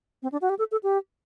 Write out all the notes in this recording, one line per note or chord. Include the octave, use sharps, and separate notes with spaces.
C4
D4
F#4
G4
A4
A4
G4